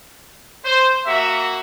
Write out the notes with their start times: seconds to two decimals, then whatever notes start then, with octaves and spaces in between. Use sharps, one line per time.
0.65 C5
1.06 A#3 F#4 E5